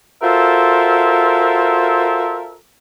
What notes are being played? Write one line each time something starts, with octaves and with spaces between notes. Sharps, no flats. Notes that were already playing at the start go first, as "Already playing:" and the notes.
F4 F#4 A4 A#4 C5 E5